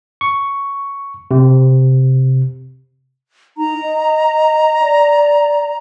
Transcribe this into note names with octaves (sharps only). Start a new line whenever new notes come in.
C#6
C3
D#4 A#5
D#5
D5